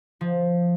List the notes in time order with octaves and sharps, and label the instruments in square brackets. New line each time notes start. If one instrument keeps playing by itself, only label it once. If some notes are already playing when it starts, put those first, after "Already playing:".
[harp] F3